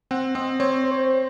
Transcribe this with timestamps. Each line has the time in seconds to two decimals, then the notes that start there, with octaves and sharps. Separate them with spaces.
0.11 C4 F#5
0.35 C4 D#5
0.59 C4 C#5
0.84 C5
0.91 C#5
0.98 C5